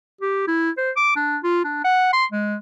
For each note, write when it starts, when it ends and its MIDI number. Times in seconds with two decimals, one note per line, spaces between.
0.21 0.47 67
0.47 0.70 64
0.77 0.91 72
0.97 1.14 86
1.16 1.37 62
1.43 1.64 65
1.64 1.82 62
1.84 2.08 78
2.13 2.25 84
2.32 2.56 56